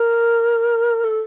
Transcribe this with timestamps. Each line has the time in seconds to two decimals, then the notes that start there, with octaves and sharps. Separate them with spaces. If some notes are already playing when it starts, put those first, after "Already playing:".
Already playing: A#4
1.04 A4